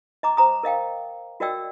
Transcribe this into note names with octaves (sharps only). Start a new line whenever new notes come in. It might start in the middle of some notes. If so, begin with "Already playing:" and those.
D#5 A#5 D6
C5 A#5 D#6
A#4 D#5 F5 G5
F#4 A#4 D5 D#5 G5 E6